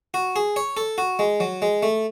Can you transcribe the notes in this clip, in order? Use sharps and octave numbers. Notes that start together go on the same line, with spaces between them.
F#4
G#4
C#5
A4
F#4
G#3
F#3
G#3
A3